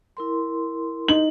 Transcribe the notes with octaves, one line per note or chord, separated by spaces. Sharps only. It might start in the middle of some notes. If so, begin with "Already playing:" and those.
E4 A#4 C6
D#4 F#7